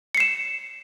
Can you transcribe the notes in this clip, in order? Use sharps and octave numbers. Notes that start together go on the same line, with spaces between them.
C7 C#7 E7